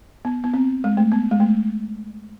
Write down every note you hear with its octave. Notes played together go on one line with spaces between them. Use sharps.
B3
B3
C4
G#3
A3
B3
G#3
A3